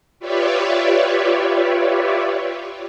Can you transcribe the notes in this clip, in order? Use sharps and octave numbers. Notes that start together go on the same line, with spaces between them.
F4 G4 B4 C#5 D5 E5